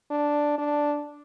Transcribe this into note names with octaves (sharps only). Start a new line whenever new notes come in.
D4
D4